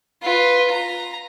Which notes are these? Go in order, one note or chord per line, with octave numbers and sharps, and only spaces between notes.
F4 B4
A#5